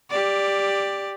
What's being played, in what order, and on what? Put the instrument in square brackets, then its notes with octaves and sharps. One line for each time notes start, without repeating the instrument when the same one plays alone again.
[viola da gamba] G4 D5